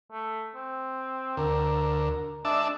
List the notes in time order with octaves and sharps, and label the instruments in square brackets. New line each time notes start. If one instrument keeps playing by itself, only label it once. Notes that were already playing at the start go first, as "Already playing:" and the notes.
[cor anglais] A3
C4
[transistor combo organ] D2 [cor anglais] A#4
[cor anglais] G#3 [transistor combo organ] D4 E5 A5